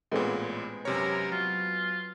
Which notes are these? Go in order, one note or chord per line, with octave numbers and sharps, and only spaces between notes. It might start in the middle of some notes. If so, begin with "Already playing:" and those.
A1 A#2 G#3 B3 C4
F#2 C3 A#4 C#5
F#3 F4